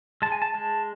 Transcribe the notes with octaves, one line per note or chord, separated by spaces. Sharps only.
G#3 A5
G#5
A5
G#3 A5